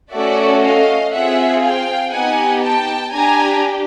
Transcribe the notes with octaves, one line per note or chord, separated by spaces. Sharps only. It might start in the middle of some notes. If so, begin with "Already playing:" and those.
A3 C#4 F#4 A4 D5 E5
D#5 F5
C4 F4 G#4 E5 F#5
F5 G5
B3 D#4 G4 F#5 G#5
G5 A5
D4 G4 G#5 A#5